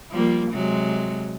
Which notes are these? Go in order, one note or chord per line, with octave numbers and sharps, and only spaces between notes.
F3 G3 A#3
C3 F#3 G#3